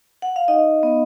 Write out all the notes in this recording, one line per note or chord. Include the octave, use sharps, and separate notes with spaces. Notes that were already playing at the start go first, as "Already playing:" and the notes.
F#5
F5
D#4 D#5
B3